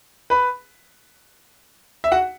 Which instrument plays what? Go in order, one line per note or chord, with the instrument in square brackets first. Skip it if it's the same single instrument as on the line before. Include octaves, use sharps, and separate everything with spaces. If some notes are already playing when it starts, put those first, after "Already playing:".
[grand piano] B4 B5
E5
F#4 F#5